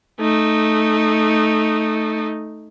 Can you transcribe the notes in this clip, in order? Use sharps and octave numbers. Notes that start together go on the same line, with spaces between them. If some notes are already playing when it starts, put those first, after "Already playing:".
A3 D#4